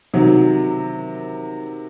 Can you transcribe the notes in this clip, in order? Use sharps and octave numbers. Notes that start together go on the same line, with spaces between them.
C3 D#3 F#3